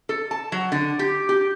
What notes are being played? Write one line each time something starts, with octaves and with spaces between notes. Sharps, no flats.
A4
A5
F#3
D3
G4
G4